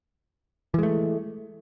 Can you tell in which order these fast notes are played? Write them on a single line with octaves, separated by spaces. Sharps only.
E3 G#3 A3